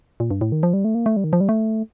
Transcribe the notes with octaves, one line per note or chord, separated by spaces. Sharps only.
A#2
G2
A2
D#3
F3
G3
A3
A#3
A3
G3
D#3
F3
G3
A3